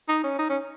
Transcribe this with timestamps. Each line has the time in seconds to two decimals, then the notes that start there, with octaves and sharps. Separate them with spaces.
0.09 D#4
0.24 C#4
0.39 D#4
0.49 C#4